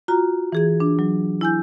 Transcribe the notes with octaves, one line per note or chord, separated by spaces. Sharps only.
F4 F#4 A#5
E3 G#4 G#6
D4
F#3
E4 G#5 G6